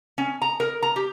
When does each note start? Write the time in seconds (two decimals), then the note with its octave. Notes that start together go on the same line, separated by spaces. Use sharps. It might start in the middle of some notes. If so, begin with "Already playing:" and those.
0.18 C#4
0.42 A#5
0.60 A#4
0.82 A#5
0.96 G4